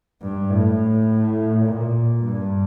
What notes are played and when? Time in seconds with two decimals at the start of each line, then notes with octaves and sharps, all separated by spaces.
0.21 G2
0.50 A2
1.66 A#2
2.23 G2